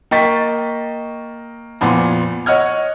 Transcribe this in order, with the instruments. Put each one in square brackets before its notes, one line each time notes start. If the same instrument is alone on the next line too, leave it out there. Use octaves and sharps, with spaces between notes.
[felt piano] A#3 D#5 G5 C#6 A6 B6
F2 A#2 B3 G#5 C6
C#5 D#5 F#5 F6 G#6